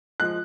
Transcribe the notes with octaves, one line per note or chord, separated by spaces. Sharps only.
F3 G#3 F#6